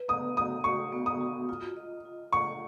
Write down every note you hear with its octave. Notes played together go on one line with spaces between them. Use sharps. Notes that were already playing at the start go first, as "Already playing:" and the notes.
Already playing: B4
B3 D#6
F#4 D#6
F#4 C#6
B3
D#6
F#4
F4
D#5
F4
F#5 C#6